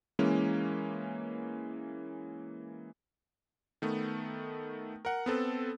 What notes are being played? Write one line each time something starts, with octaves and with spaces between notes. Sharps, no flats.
E3 G#3 A#3 C#4
D#3 A3 B3
A#4 F#5
B3 C4 A4 B4